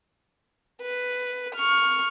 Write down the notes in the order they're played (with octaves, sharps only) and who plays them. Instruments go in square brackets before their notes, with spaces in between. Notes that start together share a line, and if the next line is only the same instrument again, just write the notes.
[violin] B4
C#6 F6